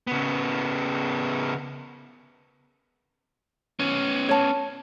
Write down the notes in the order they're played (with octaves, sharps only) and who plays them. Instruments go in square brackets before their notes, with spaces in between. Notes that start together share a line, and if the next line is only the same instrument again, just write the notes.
[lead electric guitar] C#3 B3
[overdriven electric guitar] B3 C#4
[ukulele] C#5 A5